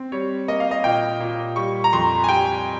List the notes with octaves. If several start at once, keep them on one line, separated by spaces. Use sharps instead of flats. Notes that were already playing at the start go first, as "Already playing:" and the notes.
Already playing: C4
G3 C#5
A#3 D#5
F5
D#5
A#2 G5
A#2
G3 C#6
A#5
F2 C6
G#5
G3 G5